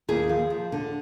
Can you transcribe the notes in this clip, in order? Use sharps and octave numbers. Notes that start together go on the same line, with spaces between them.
D#2 G#4
F3
D#2
D3